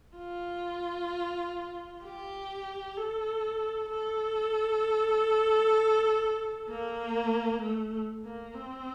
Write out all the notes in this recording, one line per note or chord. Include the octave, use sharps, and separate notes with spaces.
F4
G4
A4
A4
A#3
A3
A#3
C4